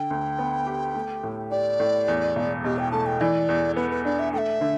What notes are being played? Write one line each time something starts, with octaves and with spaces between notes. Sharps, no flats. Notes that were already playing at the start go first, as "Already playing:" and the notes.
Already playing: D3 G5
D2
B3
G4
A3
A2
G4 D5
A2
E2
E1
B2 G4
G5
A3 A5
G5
E3 D5
E2
B3 B4
B4
D4 D5
E5
A3 E5 G5
D3